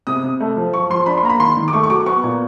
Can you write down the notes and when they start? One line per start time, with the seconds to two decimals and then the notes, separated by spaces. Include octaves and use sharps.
0.07 C3 D#6
0.23 C3
0.40 A3
0.57 F3
0.74 F3 C#6
0.90 F3 C6
1.06 D4 B5
1.18 C6
1.23 A#3 A#5
1.30 B5
1.40 D#3 C6
1.57 D#3
1.68 D6
1.73 A3 C#6
1.83 C#6
1.90 F#3 D6
2.06 B3 C#6
2.24 A#2